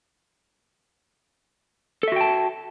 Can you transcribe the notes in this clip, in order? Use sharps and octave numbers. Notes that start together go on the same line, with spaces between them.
F#4 A4 E5 G5 A5